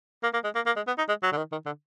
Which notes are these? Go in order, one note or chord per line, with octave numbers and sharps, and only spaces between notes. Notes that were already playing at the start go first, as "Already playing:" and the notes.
A#3
A#3
G#3
A#3
A#3
G#3
B3
D#4
G#3
F#3
D3
D#3
D#3
D3